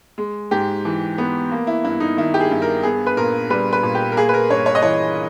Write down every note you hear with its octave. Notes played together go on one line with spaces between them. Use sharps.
G#3
G#2 G4
E3
B3
A#3
E4
G2 E4
D#4
D#3 E4
G4
G#4
G2
A#4
B3 G#4
B4
A#2 A#4
G3 B4
B4
A#2
G4
A#4
A#3 G#4
B4
A#4
G2 C#5
C#5
D#5
E3 C#5